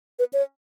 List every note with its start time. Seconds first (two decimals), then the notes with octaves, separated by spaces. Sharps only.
0.19 B4
0.33 C#5